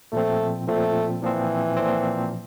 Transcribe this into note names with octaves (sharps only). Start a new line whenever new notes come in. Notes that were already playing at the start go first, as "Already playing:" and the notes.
A#2 F3 A3 C4
A#2 F3 A3 C4
A#2 E3 F3 C4
A#2 F3 C4